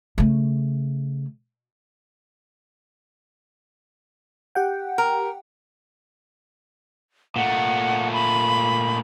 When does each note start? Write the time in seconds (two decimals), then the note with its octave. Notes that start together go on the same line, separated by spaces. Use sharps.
0.18 C#3 A3
4.55 G4 F#5 G5
4.98 A#4
7.36 A#2 A3 F#5
8.13 B5